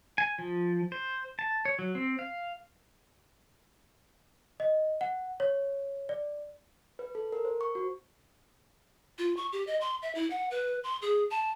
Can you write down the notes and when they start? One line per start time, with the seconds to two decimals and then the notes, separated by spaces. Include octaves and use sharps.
0.18 G#5
0.38 F3
0.92 C5
1.39 A5
1.65 C#5
1.79 F#3
1.95 C4
2.19 F5
4.60 D#5
5.01 F#5
5.40 C#5
6.09 D5
6.99 B4
7.15 A4
7.32 A#4
7.45 C5
7.61 C#6
7.75 F#4
9.18 F4
9.37 C#6
9.53 G4
9.67 D#5
9.81 C6
10.02 E5
10.15 E4
10.30 F#5
10.51 B4
10.84 C6
11.02 G#4
11.31 A5